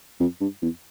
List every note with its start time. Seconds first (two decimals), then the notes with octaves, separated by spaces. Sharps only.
0.20 F2
0.41 G2
0.62 E2